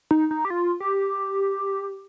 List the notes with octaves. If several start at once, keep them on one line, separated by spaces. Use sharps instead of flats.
D#4
D#4
G4
F4
G4